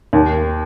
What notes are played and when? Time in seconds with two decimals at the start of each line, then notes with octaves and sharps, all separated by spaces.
0.13 D#2